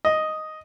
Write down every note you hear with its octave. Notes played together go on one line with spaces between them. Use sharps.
D#5